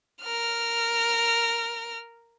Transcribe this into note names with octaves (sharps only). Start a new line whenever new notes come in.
A#4 F6